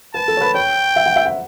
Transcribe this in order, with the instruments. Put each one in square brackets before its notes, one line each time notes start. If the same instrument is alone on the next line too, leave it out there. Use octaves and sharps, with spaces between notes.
[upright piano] B4 [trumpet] A5
[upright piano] A4
C#5
B4
[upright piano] C#5 [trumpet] G5
[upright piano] E5
F#5
E5
F#5